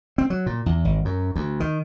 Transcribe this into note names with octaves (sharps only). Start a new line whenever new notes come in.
C4
F#3
A#2
E2
G#1
F#2
D2
D#3